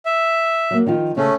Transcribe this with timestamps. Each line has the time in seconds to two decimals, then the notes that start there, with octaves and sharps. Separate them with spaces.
0.06 E5
0.71 F#3 A#3
0.86 D#3 F3 F4
1.17 C#3 A3 C4 C#4 G#4